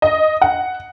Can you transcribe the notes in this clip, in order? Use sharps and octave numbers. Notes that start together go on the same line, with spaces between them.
D#5
F#5